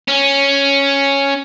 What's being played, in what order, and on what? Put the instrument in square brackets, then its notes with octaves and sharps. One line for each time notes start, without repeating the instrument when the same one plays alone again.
[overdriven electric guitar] C#4